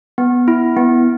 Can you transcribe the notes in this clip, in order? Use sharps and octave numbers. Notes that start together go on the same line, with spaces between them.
B3
E4
B3